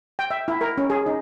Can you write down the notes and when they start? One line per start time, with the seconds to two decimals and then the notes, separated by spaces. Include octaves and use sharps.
0.19 G5
0.31 E5
0.48 E4
0.61 A#4
0.78 C#4
0.90 G#4
1.06 D#4